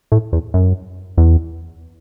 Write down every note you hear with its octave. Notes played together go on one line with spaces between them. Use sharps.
A2
E2
F#2
E2